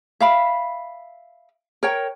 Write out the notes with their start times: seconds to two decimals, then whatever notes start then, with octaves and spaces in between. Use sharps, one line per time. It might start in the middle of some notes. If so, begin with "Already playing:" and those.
0.20 E5 F5 B5
1.83 A#4 C#5 G5